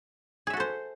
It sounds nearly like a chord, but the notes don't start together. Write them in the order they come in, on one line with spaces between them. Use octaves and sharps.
G#4 E5 F#4 A4 C5